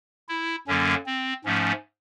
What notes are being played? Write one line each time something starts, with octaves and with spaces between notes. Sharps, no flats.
E4
F#2 D3 F#3 A#3 C#4
C4
G#2 F3 A3 C#4